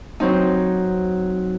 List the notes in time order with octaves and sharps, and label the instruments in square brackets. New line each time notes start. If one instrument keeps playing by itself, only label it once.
[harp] F#3 C4 D#4